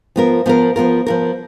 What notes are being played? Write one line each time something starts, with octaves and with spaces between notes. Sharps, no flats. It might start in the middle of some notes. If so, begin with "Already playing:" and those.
F3 B3 F4 A#4
F3 B3 F4 A#4
F3 B3 F4 A#4
F3 B3 F4 A#4